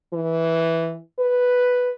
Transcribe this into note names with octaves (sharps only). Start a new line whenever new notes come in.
E3
B4